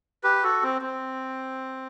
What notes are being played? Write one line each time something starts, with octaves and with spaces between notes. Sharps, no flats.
G4 B4
F#4 A4
C4
C4